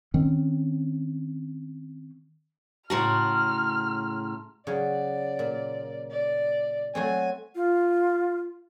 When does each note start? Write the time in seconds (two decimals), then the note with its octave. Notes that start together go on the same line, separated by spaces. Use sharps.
0.14 D#3 C4 C#4
2.90 A2 C#3 F#4 A5 A#5 C6 F6
4.67 C#3 F#3 D5
5.39 A#2
6.11 D5
6.95 F#3 A3 C4 G#5
7.55 F4